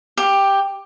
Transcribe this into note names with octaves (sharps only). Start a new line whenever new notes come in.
G4